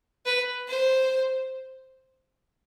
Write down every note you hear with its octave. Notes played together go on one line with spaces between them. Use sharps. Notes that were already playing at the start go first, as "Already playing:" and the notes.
B4
C5